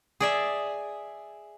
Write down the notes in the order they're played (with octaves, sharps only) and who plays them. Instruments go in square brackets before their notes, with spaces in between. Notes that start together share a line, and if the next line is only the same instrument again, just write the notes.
[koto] G#4 D5 E5